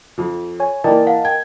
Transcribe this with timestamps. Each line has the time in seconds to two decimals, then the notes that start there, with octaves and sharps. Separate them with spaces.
0.18 F2 F3
0.60 C#5 G#5
0.84 E3 A#3 A#4 D5 D#5 G5 A5
1.07 F5 F#5
1.25 G5 G#6